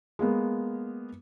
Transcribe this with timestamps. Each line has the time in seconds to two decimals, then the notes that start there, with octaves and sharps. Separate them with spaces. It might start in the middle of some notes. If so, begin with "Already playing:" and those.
0.19 G#3 A#3 B3